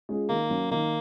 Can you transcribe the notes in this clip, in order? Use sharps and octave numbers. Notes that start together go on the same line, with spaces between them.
G#3 C#4 F4 G#4
D#3 A#3
F#3 C#4
D#3 A#3